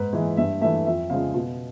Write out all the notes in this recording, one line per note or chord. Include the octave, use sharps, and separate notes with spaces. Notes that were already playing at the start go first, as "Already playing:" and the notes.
Already playing: G#2 B4
E3 G#3
G2 E5
E3 A3 E5
F2 E5
C#3 F3 G#3 F5
B2